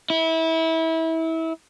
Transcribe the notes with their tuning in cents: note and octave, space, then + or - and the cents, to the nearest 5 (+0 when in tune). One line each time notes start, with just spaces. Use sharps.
E4 -25